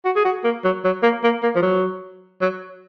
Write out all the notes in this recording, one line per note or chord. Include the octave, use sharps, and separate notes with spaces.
F#4
G#4
F#4
A#3
F#3
F#3
A#3
A#3
A#3
F3
F#3
F#3